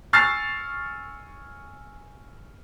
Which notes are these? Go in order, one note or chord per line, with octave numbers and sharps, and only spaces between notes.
G#5 C#6 E6 F6 A6 C7